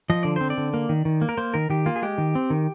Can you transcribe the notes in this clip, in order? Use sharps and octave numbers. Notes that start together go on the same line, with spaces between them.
F3 D#5
D3 D5
C4 C5
D5
D3
A#3
D#3
D#3
A#3
A#4
A#3 C5
D#3 A#4
D#3 G4
A#3 F4
G#4
G#3 G4
D#3
C4
D#3